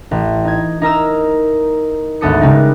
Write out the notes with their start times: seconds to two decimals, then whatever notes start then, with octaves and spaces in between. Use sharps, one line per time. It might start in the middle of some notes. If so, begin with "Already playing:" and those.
0.11 A1
0.45 D#4 G#6
0.82 D#4 A#4 A#5 E6
2.21 G#1 D2 B3 A4 D#6 C#7
2.41 C#3 G3 G#3 B3 D#4